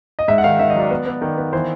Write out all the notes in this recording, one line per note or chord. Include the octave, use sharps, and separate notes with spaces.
D#5
G#2 E5
F#5
D#3 F5
D#3 E5
D#5
F#3 D5
B3
B3
D#3
B3
E3 C5